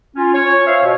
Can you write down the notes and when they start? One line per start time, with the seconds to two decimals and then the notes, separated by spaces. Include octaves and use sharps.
0.16 C#4 F4
0.34 C#5
0.67 C5 E5 F5
0.83 B2